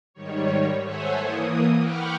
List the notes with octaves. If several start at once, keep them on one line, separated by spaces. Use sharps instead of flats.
G#2 D#3 G3 C#5
A4 C5 C#5 E5 F#5 G#5
E3 A#3 D#6
F#5 G5 B5 C#6 D6 F6